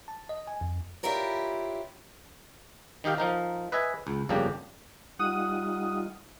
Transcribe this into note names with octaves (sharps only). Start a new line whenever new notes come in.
A5
D#5
G#5
F2
D4 E4 F4 G4 A#4 C#5
D#3 D#4 G4 F5 G5
F3 D#4 A#4
B4 D#5 E5 G#5
C#2
G1 F2 C#3 A#3 D4 G4
G3 D#4 F4 F#5 D#6